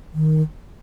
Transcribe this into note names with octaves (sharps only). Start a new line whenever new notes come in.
D#3